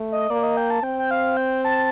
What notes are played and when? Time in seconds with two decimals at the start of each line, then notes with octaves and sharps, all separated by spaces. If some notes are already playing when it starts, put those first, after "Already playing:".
Already playing: A3
0.12 D#5
0.30 A#3 D5
0.43 D#5
0.57 G5
0.70 A5
0.83 C4 G5
0.99 G5
1.11 F5
1.37 G5
1.65 A5